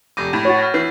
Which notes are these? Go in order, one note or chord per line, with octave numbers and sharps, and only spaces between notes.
F1 D6 G6 A#6 D#7
A2 G6 G#6 E7
F#4 C#5 G#6 A6
F6 G#6 A#6
E3 G6 C7